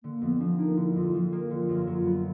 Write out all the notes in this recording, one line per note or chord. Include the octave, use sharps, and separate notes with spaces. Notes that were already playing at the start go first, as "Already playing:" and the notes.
D3 A#3
F2 B3
F3 D4
A#3 D#4
D3 E4
F2 F4
F3
A#3
D3 F4
F#2
F#3
B3